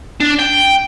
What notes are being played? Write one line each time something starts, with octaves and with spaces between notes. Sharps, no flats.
D4
G5